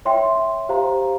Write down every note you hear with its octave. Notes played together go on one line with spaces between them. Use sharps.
C#5 E5 G5 C6
G4 C5 F5 A#5